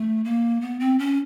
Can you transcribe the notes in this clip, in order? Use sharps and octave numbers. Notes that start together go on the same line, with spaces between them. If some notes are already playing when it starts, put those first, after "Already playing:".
Already playing: A3
A#3
B3
C4
C#4